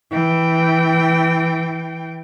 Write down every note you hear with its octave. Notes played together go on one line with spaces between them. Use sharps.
E3 G5